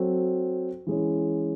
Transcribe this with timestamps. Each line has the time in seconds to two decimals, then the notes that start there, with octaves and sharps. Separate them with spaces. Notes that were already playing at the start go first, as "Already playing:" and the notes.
Already playing: F#3 C4 F#4 A4
0.87 E3 G#3 C#4